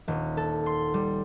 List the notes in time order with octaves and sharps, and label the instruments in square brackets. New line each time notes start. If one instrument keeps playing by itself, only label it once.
[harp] D#1
A4
C6
G3